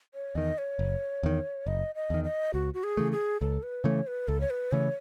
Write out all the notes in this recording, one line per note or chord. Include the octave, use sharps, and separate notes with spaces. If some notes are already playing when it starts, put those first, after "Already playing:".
C#5
E2 D#3 D#5
C#5
F#1
E2 D#3
F#1 D#5
D#5
E2 D#3
D#5
C#2 F#4
F#4
G#4
C#3 E3 A3
G#4
C#2 A4
B4
C#3 E3 A3 C#5
B4
C#2 A4
C#5
B4
C#3 E3 A3 C#5